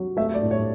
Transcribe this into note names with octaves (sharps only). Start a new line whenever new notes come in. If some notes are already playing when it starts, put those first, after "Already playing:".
Already playing: F#3
A3 E5
D5
A2
C#5